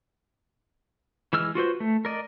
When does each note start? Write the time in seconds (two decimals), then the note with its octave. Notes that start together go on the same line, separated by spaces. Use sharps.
1.33 E3 G#3 E6 F6
1.55 F4 F#4 B4 C5
1.80 A3
2.05 A#4 D5 D#5